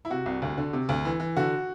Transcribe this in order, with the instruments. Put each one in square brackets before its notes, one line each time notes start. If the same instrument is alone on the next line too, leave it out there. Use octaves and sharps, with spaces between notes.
[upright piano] E4
C3 F#4
C2
D2
D3
C3
D2
E3
E3
D3 F#4